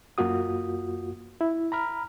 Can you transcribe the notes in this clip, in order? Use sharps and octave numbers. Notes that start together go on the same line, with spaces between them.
F#2 A#3 F4 F#4 D#6
E4
A#5 B5 F6